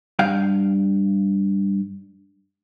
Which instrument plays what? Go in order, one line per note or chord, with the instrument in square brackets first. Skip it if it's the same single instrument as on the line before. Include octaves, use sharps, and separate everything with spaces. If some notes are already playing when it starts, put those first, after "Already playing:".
[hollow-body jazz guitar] G2 F5 G5